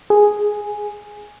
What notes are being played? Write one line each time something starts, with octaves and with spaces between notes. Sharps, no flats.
G#4